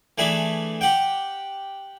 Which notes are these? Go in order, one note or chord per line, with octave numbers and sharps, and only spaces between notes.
E3 A3 D4 G#4 B5
G4 F#5 G5